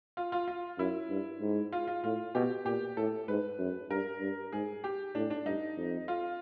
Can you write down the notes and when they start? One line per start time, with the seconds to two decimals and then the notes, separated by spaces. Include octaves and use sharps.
0.17 F4
0.32 F4
0.48 F4
0.78 F#2 E4
1.09 G2
1.41 G#2
1.72 F4
1.87 F4
2.04 A2 F4
2.35 B2 G4
2.65 A#2 G4
2.97 A2 A4
3.28 G#2 B4
3.58 F#2
3.90 G2 A#4
4.21 G2
4.52 G#2 G#4
4.84 G4
5.15 A2 D4
5.30 D4
5.45 G2 D#4
5.77 F2
6.08 F4